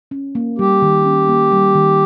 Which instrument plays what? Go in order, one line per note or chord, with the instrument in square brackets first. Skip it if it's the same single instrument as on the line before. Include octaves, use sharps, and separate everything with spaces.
[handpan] C#4
A#3
[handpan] G3 [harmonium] G4
[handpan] D#3
C#4
A#3
G3
D#3